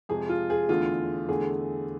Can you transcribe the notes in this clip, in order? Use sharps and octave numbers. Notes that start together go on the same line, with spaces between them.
F2 C3 G#3 G#4
F4
G#4
E2 D3 A3 F4
E2 D3 A3 G#4